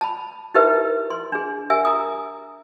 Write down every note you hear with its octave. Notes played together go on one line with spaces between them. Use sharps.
A5 B5
D#4 E4 G4 A#4 B4 E5
C6
D4 G#4
G4 A#4 E5 G#5 E6
A#5 D#6